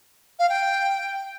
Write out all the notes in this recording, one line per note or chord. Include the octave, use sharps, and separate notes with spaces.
F5
G5